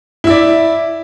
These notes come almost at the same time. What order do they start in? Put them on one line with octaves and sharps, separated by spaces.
E4 E5 D5